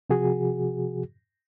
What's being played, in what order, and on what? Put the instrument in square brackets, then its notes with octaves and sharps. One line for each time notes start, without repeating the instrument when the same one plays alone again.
[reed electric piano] C3 F3 F#4 G#4